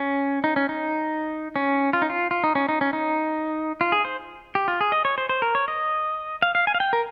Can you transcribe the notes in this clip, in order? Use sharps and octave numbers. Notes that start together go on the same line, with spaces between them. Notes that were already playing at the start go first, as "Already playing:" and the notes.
Already playing: C#4
D#4
C#4
D#4
C#4
F4
D#4
F4
F4
D#4
C#4
D#4
C#4
D#4
F4
G#4
C5
G4
F4
G#4
D#5
C#5
C5
C5
A#4
C#5
D#5
F5
F5
G#5
F5
G5
A#4